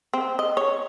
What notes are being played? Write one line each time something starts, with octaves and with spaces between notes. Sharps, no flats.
C4
D#5
C#5